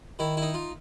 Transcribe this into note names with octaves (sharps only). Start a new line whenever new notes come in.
D#3 E4
D#4 E4
F4